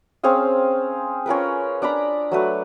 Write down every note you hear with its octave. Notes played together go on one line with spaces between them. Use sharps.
C4 C#4 G#4 F5
C#4 F4 A#4 B4
D4 D5 A#5 B5
F#3 A3 B4